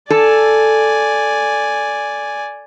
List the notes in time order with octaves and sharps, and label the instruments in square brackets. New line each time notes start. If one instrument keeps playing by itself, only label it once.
[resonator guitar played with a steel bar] A4 [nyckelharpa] D5 G#5